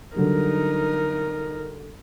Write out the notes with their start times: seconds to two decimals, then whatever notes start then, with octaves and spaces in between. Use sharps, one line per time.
0.16 D3 F#3 G3 D#4 A#4